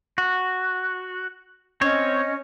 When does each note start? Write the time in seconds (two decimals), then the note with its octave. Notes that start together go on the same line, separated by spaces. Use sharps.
0.18 F#4
1.81 C4 C#4 C#5 D#5